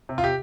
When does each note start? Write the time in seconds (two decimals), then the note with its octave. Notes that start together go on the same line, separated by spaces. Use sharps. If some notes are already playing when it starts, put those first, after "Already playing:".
0.09 C3
0.18 F4
0.24 G4